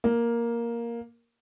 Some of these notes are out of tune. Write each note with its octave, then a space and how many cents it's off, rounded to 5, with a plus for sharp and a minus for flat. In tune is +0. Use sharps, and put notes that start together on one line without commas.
A#3 +5